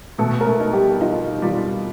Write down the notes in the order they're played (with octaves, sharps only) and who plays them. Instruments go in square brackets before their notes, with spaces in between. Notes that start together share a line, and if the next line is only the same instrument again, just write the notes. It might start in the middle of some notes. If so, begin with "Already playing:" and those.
[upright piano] B2 [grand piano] A3 A4
[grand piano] A#4
A3 A4
[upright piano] D#4
[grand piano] G3 G4
[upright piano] D#4 [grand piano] F4
[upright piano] G3 [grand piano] F4